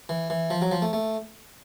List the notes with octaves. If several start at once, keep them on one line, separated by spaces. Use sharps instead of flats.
E3
E3
F3
F#3
F3
A3
A3